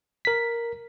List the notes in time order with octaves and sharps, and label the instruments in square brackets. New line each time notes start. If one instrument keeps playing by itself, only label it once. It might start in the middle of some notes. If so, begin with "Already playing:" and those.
[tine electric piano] A#4 B6